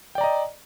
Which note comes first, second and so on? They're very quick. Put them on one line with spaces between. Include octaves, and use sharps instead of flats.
G5 D5 A#5 D#5